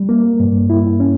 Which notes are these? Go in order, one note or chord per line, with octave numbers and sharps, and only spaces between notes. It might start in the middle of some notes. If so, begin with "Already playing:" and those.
Already playing: G3
A#3
G2
E4
C#4